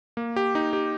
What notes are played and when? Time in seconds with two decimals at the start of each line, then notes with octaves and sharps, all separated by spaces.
0.17 A#3
0.36 G4
0.55 D#4
0.73 G4